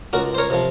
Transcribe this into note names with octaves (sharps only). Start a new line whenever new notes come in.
C#2 F#4 A#4
C5
A#4 C#5
C3 F3